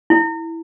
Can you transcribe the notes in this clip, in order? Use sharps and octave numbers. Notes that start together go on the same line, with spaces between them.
E4